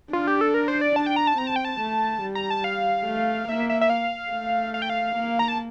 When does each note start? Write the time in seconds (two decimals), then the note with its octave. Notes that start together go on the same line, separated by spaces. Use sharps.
0.12 D4 F4
0.27 G4
0.41 A4
0.54 A#4
0.68 C5
0.81 D5
0.96 D4 A5
1.06 G5
1.16 A#5
1.27 A5
1.38 C4 A#5
1.47 A5
1.56 G5
1.65 A5
1.81 A3
2.23 G3
2.35 A#5
2.50 A5
2.64 F5
3.05 A3
3.49 A#3 E5
3.70 E5
3.81 E5
3.90 F5
4.31 A3
4.74 F5
4.82 G5
4.90 F5
5.16 A#3
5.39 A#5
5.48 A5